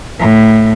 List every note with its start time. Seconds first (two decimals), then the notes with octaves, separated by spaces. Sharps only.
0.19 A2